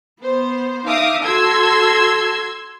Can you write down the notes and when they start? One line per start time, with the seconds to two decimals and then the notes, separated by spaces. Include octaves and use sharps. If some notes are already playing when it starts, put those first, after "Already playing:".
0.22 B3 C5
0.86 D#4 E5 F5 D6 D#6
1.25 F#4 A4 C6 E6 G#6